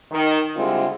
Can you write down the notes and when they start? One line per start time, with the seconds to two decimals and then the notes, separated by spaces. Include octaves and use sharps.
0.12 D#3
0.56 D3 G3 G#3 C4 E4 F4